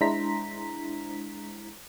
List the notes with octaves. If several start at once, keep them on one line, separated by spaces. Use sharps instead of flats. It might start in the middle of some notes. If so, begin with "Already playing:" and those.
G#3 D4 E4 C5 A#5 B6